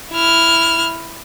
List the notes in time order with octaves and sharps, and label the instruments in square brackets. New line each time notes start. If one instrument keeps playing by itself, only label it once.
[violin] E4 F6